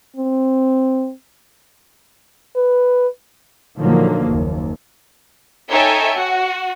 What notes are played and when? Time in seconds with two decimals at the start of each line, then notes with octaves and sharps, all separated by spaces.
0.16 C4
2.56 B4
3.78 A#2 D3 D#3 F3 F#3 A#3
4.27 F#1 D#2
5.70 D#4 A4 C#5 E5 G5 G#5
6.15 F#4